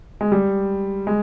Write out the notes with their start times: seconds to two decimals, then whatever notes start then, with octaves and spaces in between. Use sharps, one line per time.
0.21 G#3
0.32 G3
1.07 G#3